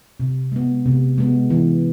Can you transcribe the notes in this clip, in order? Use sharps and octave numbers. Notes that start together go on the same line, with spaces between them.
C3
G#3 B3
C3
G#3 B3
E3